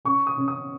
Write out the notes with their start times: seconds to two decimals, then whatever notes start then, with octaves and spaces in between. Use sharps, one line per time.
0.05 C#4 C#6
0.27 D#6
0.38 C#4
0.48 D#6